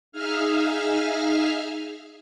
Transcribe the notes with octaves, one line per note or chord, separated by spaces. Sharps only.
D#4 G#4 E5 F5 F6